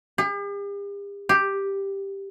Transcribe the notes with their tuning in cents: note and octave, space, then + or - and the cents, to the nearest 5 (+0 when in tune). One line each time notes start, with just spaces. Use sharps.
G4 +45
G4 +5